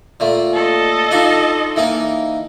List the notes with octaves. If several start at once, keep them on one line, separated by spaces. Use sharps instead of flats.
A#2 A3
A4 D#5
D4 D#4 F4
E3 A#3 D#4